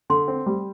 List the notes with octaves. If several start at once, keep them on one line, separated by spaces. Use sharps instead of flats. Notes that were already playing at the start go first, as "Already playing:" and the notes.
D3 C6
C4
G3